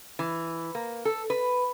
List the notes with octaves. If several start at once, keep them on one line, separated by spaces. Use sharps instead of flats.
E3
A#3
A4
B4